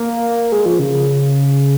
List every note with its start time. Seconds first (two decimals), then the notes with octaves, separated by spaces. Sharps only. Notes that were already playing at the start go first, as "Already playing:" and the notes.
Already playing: A#3
0.52 G#3
0.66 F3
0.79 C#3